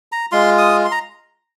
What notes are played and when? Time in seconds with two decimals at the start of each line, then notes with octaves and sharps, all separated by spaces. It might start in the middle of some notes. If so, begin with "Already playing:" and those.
0.12 A#5
0.32 G#3 F4 C6
0.58 D#6
0.85 C6
0.92 A#5